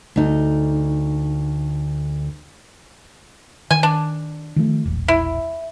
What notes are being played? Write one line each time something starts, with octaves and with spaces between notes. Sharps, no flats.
D2 D#4
D#3 G#5
D4
D#3 F3 A3
E1 A#1
E4